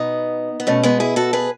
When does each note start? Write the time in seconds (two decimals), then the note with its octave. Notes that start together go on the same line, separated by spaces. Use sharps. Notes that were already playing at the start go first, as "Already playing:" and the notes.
Already playing: B2 B3 D#4
0.60 B3
0.67 B2 A3 C#4
0.83 G#3 B3
1.00 E4 G#4
1.16 F#4 A4
1.33 G#4 B4